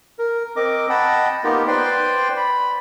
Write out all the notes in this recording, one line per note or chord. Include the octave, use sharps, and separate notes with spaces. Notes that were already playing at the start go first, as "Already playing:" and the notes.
A#4
C4 A#4 D#5 D6
D#5 F#5 G5 A5 B5
A#3 B3 D#4 F4 G4 A#4
B4 C5 D5 G5 C6
B5